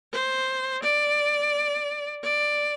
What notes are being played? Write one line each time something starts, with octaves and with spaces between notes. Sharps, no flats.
C5
D5
D5